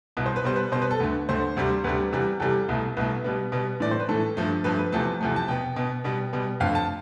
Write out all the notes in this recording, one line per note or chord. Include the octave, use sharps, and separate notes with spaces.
C2 B2 B3 B4
C5
B4
B2 G3 B3 C5
B4
B2 G3 B3 C5
B4
A4
D2 D3 A3 B4
D2 D3 A3 C5
D2 C3 G3
D2 C3 G3 B4
E2 C3 G3
E2 C3 G3 A4
C2 B2 A3
C2 B2 A3 B4
B2 G3 B3
B2 G3 B3
A2 E3 A3 D5
C5
B4
A2 E3 A3 A4
G2 F3 A3
G2 F3 A3 B4
B4
E2 C3 F3 A3 A5
E2 C3 F3 A3
A5
B2 B3 G5
B2 B3
B2 G3 B3
B2 G3 B3
F2 D3 A3 F5
A5